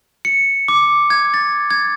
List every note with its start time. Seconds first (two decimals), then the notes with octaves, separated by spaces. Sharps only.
0.25 C#7
0.68 D6
1.10 G#6
1.34 A6
1.71 G#6